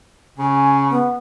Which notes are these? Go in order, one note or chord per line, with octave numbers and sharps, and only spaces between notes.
C#3 G#5
B3